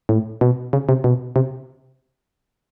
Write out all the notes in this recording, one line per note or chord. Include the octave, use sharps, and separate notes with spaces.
A2
B2
C#3
C3
B2
C3